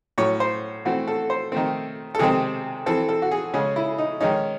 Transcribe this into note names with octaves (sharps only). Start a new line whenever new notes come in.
A2 F#3 C#4 C#5
C5
E3 A3 C4 F#4
A4
C5
D#3 A3 C4
A4
C3 D#3 G#3 C4 G#4
E3 C4 A4
A4
F#4
G#4
C#3 G#3 C#4 G#4
E4
D#4
D#3 G#3 C#4 D#4